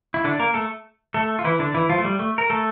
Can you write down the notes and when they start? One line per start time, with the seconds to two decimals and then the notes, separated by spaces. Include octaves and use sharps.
0.14 E4
0.24 D3 D4
0.39 A#3 A#4
0.54 A3 A4
1.14 A3 A4
1.39 F4
1.45 E3 E4
1.59 D3 D4
1.74 E3 E4
1.89 F3 F4
1.98 A3
2.05 G3
2.19 A3
2.38 A#4
2.50 A3 A4